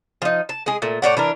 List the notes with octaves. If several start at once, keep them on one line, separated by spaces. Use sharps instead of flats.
F3 D#4
A5
G#3 G#4
A#2 A3
A2 C#5 D5 F#5
E3 D4 A#4